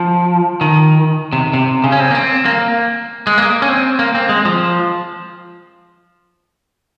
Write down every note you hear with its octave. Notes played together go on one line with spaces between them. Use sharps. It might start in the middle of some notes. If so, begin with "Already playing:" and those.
Already playing: F3
D#3
C3
C3
C#3
C#4
C4
A#3
C4
A#3
G#3
A#3
C#4
C4
A#3
C4
G#3
F3